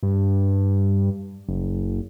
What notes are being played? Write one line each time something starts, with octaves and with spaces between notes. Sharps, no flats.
G2
F#1